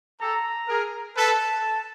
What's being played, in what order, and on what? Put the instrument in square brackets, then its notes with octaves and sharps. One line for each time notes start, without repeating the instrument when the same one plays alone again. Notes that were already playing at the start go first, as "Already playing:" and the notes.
[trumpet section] G4 A4 [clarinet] A#5
[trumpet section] G#4 A#4
[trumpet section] A4 B4 [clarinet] A5